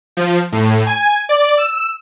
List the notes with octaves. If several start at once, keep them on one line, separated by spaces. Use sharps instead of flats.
F3
A2
G#5
D5
E6